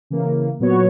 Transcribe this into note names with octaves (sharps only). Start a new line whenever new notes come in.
C#3 E3 A#3
A#2 F#3 B3 F#4 C#5